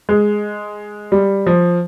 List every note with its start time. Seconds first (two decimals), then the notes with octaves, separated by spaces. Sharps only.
0.09 G#3
1.12 G3
1.47 F3